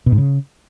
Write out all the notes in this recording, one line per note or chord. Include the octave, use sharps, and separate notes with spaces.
B2
G#2
C#3